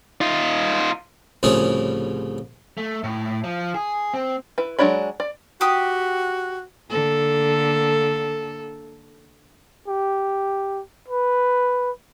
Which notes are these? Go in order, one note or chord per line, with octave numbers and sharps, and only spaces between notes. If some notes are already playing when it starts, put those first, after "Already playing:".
D#4 F4
C2 A2 C#3 F3 C#4 G#4
A3
A2
F3
G#4
C4
E4 B4
F#3 G#3 D4 C#5 B5
D5
F#4 G4 D#6
D3 A#3 A4
G4
B4